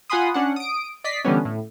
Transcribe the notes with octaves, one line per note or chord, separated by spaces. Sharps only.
F4 F#5 G#5 B5 C6 D#6
C#4 D4 F#5
D#6 D7
D5 D#5 B6 C7
D3 E3 G3 B3 C#4
A2